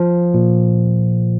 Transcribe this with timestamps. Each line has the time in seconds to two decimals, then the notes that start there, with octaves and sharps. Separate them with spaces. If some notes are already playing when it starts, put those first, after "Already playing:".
Already playing: F3
0.34 A#2